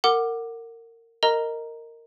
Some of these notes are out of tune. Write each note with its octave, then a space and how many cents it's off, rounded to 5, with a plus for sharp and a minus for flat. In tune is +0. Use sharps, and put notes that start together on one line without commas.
A#4 -25 F#5 +0 D6 +15
A#4 -15 D#5 +0 A#5 +0